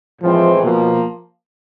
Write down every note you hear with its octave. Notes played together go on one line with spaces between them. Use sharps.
A2 E3 F3 G#3 C4
B2 F3 A#3